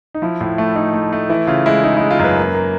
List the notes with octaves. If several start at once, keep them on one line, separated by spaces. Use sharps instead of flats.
D#4
F3 E4
A2
A3
A3 D#4
A3
A3
E3 E4
C#3 F4
G#3 E4
G#3 D#4
G#3 E4
F4
F#2 B4
A#3
A#3